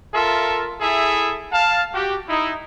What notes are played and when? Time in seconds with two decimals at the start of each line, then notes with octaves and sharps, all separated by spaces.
0.14 F4 A4 A#4 E5
0.81 E4 G#4 A4 E5
1.52 F5 A5
1.94 F#4 G4
2.29 D#4 E4